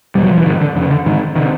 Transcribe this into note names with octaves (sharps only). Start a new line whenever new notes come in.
E2 B2 G3
F#3
F3
E3
G#2 D#3
D3
F2 C#3 D3
D3
G#2 D#3
C3 D#3